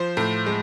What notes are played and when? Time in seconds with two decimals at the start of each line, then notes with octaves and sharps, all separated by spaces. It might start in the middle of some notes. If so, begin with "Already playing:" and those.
Already playing: F3 C5
0.17 A2
0.46 G#3